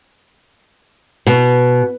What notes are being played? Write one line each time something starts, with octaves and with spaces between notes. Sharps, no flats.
B2